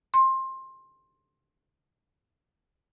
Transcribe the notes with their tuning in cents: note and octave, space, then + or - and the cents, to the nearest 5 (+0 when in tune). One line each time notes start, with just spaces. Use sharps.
C6 +20